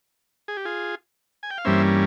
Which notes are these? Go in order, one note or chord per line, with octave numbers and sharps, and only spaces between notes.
G#4
G4
F4 G#4
G#5
G5
F5
G2 E3 G3 A#3 C#4 C5 E5